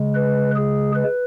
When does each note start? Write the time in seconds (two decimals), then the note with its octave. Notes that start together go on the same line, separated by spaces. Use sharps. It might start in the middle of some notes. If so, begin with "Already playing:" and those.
Already playing: C#3 G#3
0.15 B4
0.56 G#4
0.95 B4